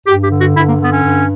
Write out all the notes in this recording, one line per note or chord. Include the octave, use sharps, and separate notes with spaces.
G2 G4
G4
D3
F#4
G2 E4
A#3
D3 B3
C#4
G2